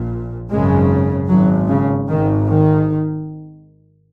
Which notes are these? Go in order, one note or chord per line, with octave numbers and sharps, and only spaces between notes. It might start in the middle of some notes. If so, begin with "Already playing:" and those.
Already playing: A#1 A#2
G#1 F#2 C#3 G#3
G#1 G#2 F#3
C#3
G#1 G#2 D#3
D#3